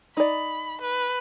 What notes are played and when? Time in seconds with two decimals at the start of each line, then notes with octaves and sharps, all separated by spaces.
0.17 D#4 D5 B5
0.81 B4